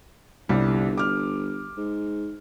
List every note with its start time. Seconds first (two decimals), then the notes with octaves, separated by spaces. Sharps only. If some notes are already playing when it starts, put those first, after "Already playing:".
0.49 G1 C2 G3
0.97 D6 F6
1.77 G#2